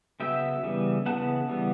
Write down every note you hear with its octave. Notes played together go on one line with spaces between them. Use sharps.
C#3 F#3 B3 E5 G5
C#3 E3 G3 B3
C#3 E3 G3 B3 F#5 A5
C#3 E3 G3 B3